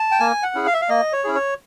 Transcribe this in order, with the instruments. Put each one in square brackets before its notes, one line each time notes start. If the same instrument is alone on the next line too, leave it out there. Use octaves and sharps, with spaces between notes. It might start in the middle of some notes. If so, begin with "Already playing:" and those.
Already playing: [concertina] A5
G5
A#3 G#5
F#5
C#4 E4 G#4
F5
E5
F5
A#3 D#5
C#5
C#4 E4 G#4
C#5